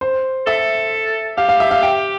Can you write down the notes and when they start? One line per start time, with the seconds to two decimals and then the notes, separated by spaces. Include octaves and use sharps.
0.01 C5
0.46 A4 E5
1.37 G4 F5
1.49 F5
1.60 E5
1.71 F5
1.83 G5